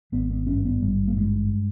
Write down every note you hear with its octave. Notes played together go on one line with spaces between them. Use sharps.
G#1 B3
B3
G2 C#4
B3
G#1 G3
A#3
G2 G#3